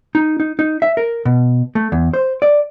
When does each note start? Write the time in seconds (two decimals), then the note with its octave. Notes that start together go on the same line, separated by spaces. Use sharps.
0.15 D#4
0.40 D#4
0.59 D#4
0.82 E5
0.97 A#4
1.25 B2
1.75 A3
1.92 E2
2.14 C5
2.42 D5